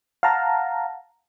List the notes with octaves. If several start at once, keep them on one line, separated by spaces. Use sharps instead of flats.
F5 F#5 A5 A#5